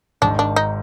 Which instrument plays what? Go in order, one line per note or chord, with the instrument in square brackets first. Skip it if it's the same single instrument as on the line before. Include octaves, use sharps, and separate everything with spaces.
[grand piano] G#1 G#2 D#3 [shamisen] D4
[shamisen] D4
D#4